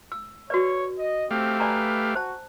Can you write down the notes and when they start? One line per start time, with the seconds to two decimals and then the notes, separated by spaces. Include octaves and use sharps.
0.12 E6
0.50 F#4 B4 C#5 D5
0.98 D#5
1.31 A3 C4 G4 F5
1.60 B4 D5 G#5 A#5
2.15 F#4 C5 A5